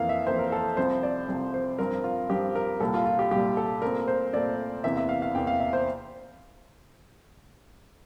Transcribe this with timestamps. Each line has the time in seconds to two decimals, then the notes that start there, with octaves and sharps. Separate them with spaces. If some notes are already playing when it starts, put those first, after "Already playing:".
Already playing: F2 E3 A#3 F5
0.09 E5
0.27 F2 E3 A#3 C5
0.39 A#4
0.52 A4
0.77 C2 C3 F3 C5
1.03 D5
1.29 C2 C3 F3
1.54 C5
1.79 G2 F3 C4 A#4
2.04 F4
2.30 G2 F3 C4 G4
2.55 A#4
2.80 C2 A#2 G3 A4
2.94 F4
3.06 F4
3.19 G4
3.31 C2 A#2 G3 G4
3.57 A4
3.82 A#2 A3 C4 A#4
4.08 C5
4.33 A#2 A3 C4 D5
4.84 E2 C3 E3 A#3 E5
4.97 E5
5.09 F5
5.22 F5
5.35 E2 C3 E3 A#3 G5
5.47 F5
5.60 E5
5.73 C5